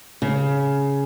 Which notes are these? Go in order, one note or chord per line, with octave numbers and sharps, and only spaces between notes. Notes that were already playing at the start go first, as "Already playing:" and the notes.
C#3